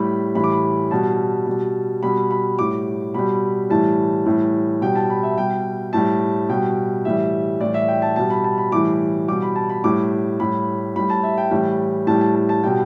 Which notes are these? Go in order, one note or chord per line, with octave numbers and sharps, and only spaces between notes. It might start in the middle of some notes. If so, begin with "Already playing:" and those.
Already playing: A2 G3 B5
A2 E3 G3 B5
D6
B5
B2 G3 A5
B2 G3
B2 G3 B5
B5
A2 G3 D6
B2 G3 B5
A2 E3 G3 A5
A2 E3 G3
B2 G3 G5
A5
B5
E5
B2 G3 G5
A2 G3 A5
B2 G3 G5
A2 E3 G3 E5
A2 E3 G3 D5
E5
G5
A5
B2 G3 A5
B5
A5
B5
A2 E3 G3 D6
B2 G3 D6
B5
A5
B5
A2 G3 D6
A2 G3 B5
A2 G3 B5
A5
E5
G5
A2 E3 G3 G5
A2 G3 A5
A5
A5
A5
B2 G3 G5